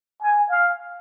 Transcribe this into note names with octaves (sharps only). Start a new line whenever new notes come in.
G#5
F5